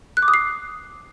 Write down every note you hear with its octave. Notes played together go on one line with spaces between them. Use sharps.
F#6
D6
D#6
C7